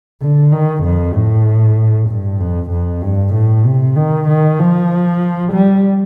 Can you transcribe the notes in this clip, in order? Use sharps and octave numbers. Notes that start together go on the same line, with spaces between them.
D3
D#3
F2
A2
G2
F2
F2
G2
A2
C3
D#3
D#3
F3
G3